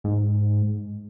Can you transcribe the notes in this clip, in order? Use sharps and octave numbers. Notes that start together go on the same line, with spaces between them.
G#2